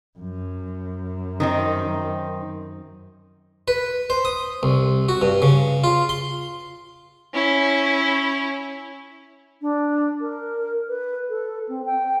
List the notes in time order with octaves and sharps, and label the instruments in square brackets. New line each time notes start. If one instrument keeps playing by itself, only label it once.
[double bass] F#2
[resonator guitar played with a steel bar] D#3 C4 D#4
[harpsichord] B4
C5
D#6
C2
F#4
G2
C#3
F4
C6
[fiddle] C#4 E4
[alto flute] D4
A#4
B4
A4
C4
G5